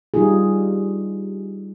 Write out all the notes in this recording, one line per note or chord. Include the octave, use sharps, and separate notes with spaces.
G3 D#4 F4 G4 G#4